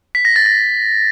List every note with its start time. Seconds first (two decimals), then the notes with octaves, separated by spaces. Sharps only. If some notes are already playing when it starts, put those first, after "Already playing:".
0.15 B6
0.25 A#6
0.36 A6
0.46 A#6